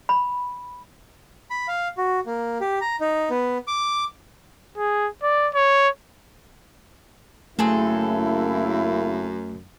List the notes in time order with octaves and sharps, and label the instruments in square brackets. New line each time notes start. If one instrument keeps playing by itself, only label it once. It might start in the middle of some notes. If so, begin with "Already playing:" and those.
[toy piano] B5
[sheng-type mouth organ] B5
F5
F#4
A#3
G4
A#5
D#4
B3
D6
[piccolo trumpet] G#4
D5
C#5
[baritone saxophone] F#2 [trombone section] C#3 A#3 E4 [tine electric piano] A3 [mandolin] C4 G#4 A4